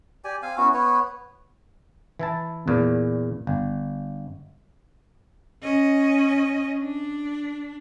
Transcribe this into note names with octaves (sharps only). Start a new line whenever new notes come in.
G4 D5 G#5
C4 F5 G#5
B3 C#4 E4 F#4
B3 B4 C#5
E3 E4 A5
E2 A#2
G1
C#4 D#5
D4